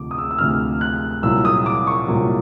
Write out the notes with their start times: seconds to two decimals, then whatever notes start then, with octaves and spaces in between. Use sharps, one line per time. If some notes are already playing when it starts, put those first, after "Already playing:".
Already playing: D2 C3 F3 D6
0.11 D#6
0.18 E6
0.31 E6
0.39 D2 C3 F3 F6
0.81 F#6
1.23 C2 A#2 F#3 E6
1.45 D#6
1.66 D6
1.87 C#6
2.08 C2 A#2 F#3